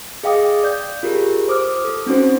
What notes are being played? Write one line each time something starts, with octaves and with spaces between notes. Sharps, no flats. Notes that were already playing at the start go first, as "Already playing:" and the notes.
G#4 D#5 F5 G5 D6 D#6
D5 G6
F4 G4 G#4 A#4
C5 D6 D#6 F6
A4
C4 C#4 D#4 F#4 C5